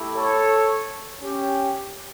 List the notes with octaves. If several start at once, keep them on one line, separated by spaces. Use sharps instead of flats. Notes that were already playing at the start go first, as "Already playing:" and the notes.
Already playing: A3 E4 G4
A4 C#5
C#4 G4